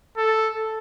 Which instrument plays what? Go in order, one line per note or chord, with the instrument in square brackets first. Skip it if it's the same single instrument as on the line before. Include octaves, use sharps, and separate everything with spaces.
[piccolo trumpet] A4